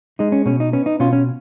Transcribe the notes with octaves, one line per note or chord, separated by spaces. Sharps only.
G#3 D#4
C#4
B2 C#4
D#4
B3 C#4
D#4
B2 C#4 F4
C#4